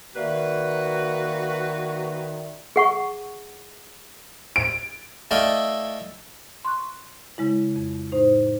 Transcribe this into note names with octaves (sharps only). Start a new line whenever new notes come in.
D#3 A#3 F#4 B4 D5 E5
G#4 F#5 C#6
D7
A3 E4 D5 D#5 F5 G5
C6 C#6 F#6
C#3 G#3 E4
F2
A2 D#4 C5